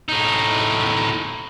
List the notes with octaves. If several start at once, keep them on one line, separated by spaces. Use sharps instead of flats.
A2 D#4